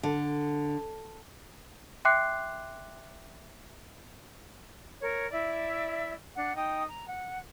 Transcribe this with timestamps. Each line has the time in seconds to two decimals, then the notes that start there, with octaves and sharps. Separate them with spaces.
0.03 D3
2.05 E5 G5 C6 D6 F#6 C7
5.01 A#4 C#5
5.31 E4 D5 E5
6.36 D4 F#5
6.56 D#4 G5 D#6
6.88 A#5
7.08 F#5